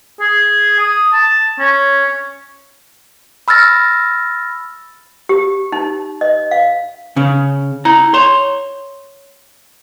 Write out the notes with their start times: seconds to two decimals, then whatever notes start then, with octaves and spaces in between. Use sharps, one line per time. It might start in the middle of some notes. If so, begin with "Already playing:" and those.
0.20 G#4
0.79 D#6
1.13 A5
1.59 C#4
3.48 B5 E6 F6 A6 A#6
5.29 G4
5.72 D#4
6.21 D#5
6.51 F5
7.16 C#3 C#4
7.85 E4 A#5
8.14 C#5 C6